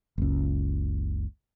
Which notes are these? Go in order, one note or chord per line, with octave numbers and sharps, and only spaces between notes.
F#1 C#2